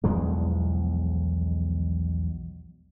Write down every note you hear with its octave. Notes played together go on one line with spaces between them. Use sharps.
B1 E2 F3 G#3